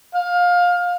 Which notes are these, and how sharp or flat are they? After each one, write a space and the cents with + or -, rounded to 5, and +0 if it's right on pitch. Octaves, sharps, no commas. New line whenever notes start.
F5 +20